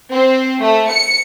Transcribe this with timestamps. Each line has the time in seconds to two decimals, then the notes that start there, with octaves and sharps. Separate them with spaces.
0.13 C4
0.62 A3
0.91 C#7